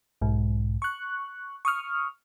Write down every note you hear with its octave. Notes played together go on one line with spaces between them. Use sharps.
B1 G#2
C#6 F#6
C#6 D#6 F6